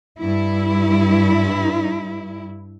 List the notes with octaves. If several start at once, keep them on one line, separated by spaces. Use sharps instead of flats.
G2 E4